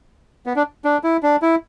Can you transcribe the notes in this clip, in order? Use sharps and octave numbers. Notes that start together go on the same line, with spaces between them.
B3
D4
D4
E4
D4
E4